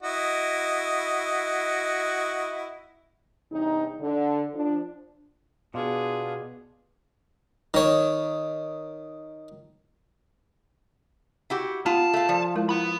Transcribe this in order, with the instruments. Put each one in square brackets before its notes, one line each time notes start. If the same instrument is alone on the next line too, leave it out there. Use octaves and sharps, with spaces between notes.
[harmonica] E4 F#4 D#5
[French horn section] E2 G2 C3 D#4
D3
F3 D4
[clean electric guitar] B2 [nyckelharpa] B3 G#4 [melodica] D4 F4
[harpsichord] D#3 C#5
[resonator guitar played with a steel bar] E4 F#4 G4
[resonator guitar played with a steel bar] B3 [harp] F4 [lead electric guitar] A5
[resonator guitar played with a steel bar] A3 F5
[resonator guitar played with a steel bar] F3 [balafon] D5
[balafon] G#3 E4 A#4
[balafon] E4 [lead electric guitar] F#5 B5